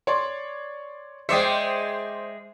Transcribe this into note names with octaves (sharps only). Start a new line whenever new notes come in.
C#5 D5 C6
G#3 C5 D5 E5 G5 D#6 C7 C#7